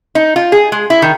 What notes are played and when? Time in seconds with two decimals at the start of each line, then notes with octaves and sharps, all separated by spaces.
0.15 D#4
0.36 F4
0.52 G#4
0.72 G#3
0.90 E4
1.02 D#3